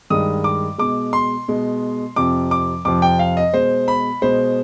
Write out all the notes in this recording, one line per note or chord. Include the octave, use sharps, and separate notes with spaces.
G2 D#3 G#3 D#6
D6
B2 G#3 D6
C6
B2 G#3
F2 C3 F3 D6
D6
F2 C3 F3 D6
G5
F5
D#5
B2 G#3 C5
B5
B2 G#3 C5